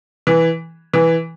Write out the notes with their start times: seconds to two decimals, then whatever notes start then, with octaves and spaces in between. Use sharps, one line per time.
0.27 E3
0.94 E3